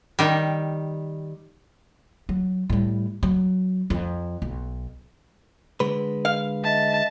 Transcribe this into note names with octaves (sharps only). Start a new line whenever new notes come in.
D#3 G3
F#3
A2 G3
F#3
F2
B1
D3 G#3 B4
F5
D#5 E5 A5